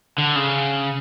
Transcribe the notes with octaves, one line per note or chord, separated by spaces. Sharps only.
D3
C#3